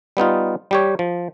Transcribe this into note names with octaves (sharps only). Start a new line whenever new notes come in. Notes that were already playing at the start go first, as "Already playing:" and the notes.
G3 B3 D#4 F4
G3 G4 C#5
F3